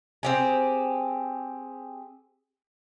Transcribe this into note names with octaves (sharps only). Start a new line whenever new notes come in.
C4 G4 G#4